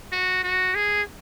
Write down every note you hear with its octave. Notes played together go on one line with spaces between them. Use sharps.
F#4
F#4
G#4